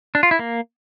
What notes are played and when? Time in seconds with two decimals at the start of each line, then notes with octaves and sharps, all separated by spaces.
0.15 D4
0.23 F4
0.31 E4
0.39 A#3